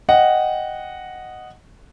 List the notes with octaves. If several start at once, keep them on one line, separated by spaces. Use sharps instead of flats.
D#5 F#5 G5